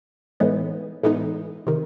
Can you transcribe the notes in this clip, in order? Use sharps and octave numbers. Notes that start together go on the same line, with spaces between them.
A2 E3 G#3 B3 D#4
A2 E3 G#3 B3 D#4
C3 D#3